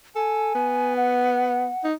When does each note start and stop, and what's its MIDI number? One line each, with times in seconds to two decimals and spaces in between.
0.15 0.51 69
0.15 0.96 80
0.55 1.69 59
0.96 1.87 78
1.84 1.94 63